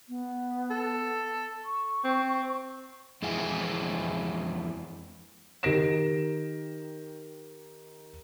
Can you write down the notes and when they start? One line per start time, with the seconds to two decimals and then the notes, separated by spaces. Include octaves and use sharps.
0.09 B3
0.71 A4
1.65 C#6
2.05 C4
3.22 F2 E3 G#3 E4 G#5
5.63 D#3 G4 A#4 A#6 D7 E7